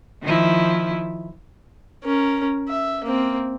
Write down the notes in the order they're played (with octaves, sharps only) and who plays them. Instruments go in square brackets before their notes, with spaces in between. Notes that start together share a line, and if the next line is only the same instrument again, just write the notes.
[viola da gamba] D#3 F3 E4
[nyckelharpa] C#4 A#4
E5
A#3 C4